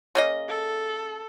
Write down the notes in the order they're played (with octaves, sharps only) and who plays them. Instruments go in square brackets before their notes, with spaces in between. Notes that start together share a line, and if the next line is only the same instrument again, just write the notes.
[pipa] C#3 A#3 D#5
[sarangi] A4